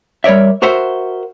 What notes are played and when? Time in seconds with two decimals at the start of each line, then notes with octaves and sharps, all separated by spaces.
0.24 G3 A#4 C#5 D5 E5
0.62 F#4 A#4 C5 E5 F#5